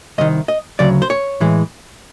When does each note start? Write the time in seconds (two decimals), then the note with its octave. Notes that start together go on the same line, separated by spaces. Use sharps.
0.18 C2 C3 D#3 D#5
0.48 D#5
0.79 D2 C#3 F#3 D5
1.02 C5
1.10 C#5
1.40 A2 E3 G#3